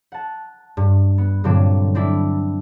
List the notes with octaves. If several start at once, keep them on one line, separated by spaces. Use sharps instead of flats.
F#5 A5
G2
B3
G2 A#2 D3 F#3 C4 D4
C4 D4 E4